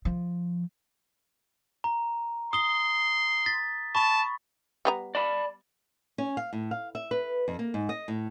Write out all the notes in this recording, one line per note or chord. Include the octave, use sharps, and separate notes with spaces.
F3
A#5
C6 D#6 G7
A6 B6
A5 B5 C#6
G3 B3 A#5
D5 A5 B5
C#4
F5
A2
F5
E5
B4
F2
A#3
G#2
D#5
A2